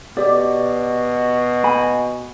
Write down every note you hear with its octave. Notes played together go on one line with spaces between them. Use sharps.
B2 G4 D5
G#5 B5